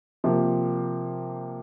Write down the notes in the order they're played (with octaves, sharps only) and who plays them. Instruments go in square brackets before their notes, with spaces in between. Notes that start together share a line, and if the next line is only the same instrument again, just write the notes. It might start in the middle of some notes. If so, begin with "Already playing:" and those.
[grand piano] C3 F3 A#3